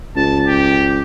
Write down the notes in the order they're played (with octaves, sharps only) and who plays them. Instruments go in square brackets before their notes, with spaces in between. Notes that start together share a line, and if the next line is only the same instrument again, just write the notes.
[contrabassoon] C#2 [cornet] A5
[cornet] G4